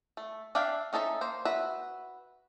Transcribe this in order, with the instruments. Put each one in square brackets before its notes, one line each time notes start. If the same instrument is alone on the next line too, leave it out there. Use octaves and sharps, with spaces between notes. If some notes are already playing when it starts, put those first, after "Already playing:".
[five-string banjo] A3
D4 E5 F5 G5
C#4 D#4 A4 C5 E5
A#3 C5
F#4 B4 E5